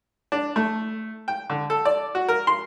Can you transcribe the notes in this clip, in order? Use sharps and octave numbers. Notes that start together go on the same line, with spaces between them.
D4
A3
G5
D3
A4
D5
F#4
A#4
C6